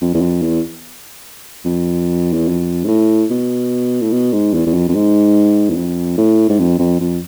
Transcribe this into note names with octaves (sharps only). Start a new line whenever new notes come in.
F2
E2
F2
E2
F2
E2
F2
G#2
A2
B2
A2
B2
G#2
E2
E2
F2
F2
G#2
E2
F2
A2
G#2
F2
F2
F2